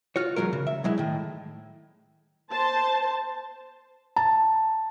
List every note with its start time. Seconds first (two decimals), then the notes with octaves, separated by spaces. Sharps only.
0.16 F4 F#4 C#5
0.36 E2 D3 F#3 G#3 A#4
0.53 C#3
0.67 E5
0.84 F#3 G#3 E4
0.98 A2 D#3
2.52 C5 A5
4.16 A5